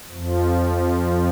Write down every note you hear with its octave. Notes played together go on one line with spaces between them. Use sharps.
F2 F3